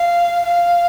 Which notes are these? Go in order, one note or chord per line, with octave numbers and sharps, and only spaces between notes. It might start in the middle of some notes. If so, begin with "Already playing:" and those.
Already playing: F5
F5